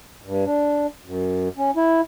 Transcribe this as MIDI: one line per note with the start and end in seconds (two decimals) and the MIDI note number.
0.24 0.45 43
0.45 0.87 62
1.05 1.48 42
1.58 1.71 61
1.76 2.01 64